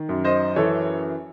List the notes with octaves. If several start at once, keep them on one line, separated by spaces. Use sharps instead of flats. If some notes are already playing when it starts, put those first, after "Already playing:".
Already playing: D#3
F#2
C5 D#5
E3 A4 C#5